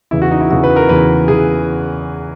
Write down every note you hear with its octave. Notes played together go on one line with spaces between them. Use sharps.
E2 C#3 E3 E4
F#4
D#4
E4
E2 C#3 E3 F#4
B4
A#4
E2 C#3 E3 B4
C#3 E3 G#4